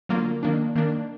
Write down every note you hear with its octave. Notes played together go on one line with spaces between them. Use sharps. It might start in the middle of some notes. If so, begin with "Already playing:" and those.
D3 F#3 A#3 F4
D#3 A#3 D4
D#3 A#3 D4